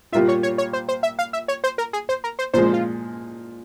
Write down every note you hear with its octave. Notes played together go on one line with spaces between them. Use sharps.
A#2 G3 A#3 F4 E5
C#5
C#5
C#5
C5
C5
E5
F5
E5
C#5
C5
A#4
G#4
C5
A#4
C5
A#2 F3 G#3 C5
F4